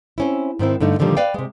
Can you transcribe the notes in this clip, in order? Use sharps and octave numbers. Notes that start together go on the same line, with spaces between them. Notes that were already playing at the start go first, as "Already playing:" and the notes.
C4 C#4 E4
G#2 D#3 C4 E4
G2 D3 A3 D#4
A#2 D3 D#3 F3 G3
B4 D5 F5 G5
C3 G#3